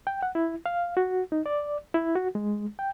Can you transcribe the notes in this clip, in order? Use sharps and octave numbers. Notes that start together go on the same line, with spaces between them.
G5
F#5
E4
F5
F#4
D#4
D5
E4
F#4
G#3
G5